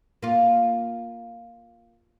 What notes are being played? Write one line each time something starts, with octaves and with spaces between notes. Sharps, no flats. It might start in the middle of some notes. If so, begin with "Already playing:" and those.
A#3 F4